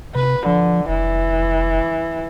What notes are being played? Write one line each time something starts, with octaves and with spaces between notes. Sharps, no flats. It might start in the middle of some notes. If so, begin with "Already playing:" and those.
C3 B4
D3 F3
F1 E3